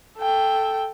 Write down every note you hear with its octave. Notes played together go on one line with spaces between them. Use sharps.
A4 G5